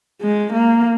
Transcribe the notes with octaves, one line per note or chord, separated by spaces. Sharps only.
G#3
A#3